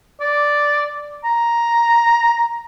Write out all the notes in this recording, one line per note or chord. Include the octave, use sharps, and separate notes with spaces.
D5
A#5